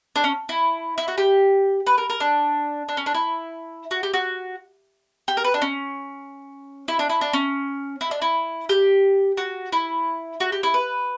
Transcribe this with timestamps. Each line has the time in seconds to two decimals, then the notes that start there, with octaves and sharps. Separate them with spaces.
0.16 D4
0.24 C#4
0.49 E4
0.98 E4
1.08 F#4
1.18 G4
1.87 B4
1.98 A#4
2.10 A#4
2.20 D4
2.89 D4
2.97 C#4
3.06 D4
3.14 E4
3.91 F#4
4.03 G4
4.14 F#4
5.28 G4
5.37 A#4
5.44 B4
5.54 D4
5.62 C#4
6.88 E4
6.99 D4
7.09 E4
7.21 D4
7.33 C#4
8.01 E4
8.11 D4
8.22 E4
8.69 G4
9.37 F#4
9.72 E4
10.40 F#4
10.52 G4
10.63 E4
10.74 B4